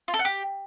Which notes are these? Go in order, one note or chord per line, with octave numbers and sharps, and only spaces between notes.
F4
A4
F#5
G4